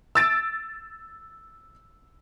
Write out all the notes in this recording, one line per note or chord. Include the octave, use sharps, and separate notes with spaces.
E6 A6 D7